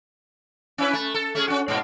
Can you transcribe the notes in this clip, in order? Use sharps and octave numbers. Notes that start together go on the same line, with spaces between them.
C#4 E4 B4
A3
A4
A3 C#4 G#4
C#4 F#4
G#2 B2